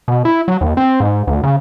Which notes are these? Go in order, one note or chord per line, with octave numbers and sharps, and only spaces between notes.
B2
E4
F#3
D#2
C4
G#2
D2
C#3